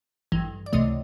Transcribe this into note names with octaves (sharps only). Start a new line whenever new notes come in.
A1 G2 E3
D5
C#2 C3 E3 A3 D#5